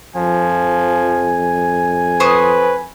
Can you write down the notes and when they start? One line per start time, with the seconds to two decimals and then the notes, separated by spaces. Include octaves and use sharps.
0.16 F2 F3 G#5
2.20 B4 C5 C#6 D#6